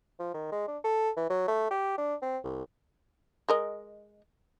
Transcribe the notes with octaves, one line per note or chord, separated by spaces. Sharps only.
F3
D#3
G#3
D4
A4
E3
F#3
A3
G4
D4
C4
C2
G#3 A#4 D#5